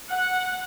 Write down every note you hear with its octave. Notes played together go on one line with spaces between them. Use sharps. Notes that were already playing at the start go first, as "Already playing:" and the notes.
F#5